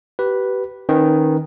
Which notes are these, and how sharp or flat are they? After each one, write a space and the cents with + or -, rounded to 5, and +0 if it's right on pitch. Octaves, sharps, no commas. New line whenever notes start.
G4 -30 B4 -5
D#3 +0 C#4 -35 B4 +0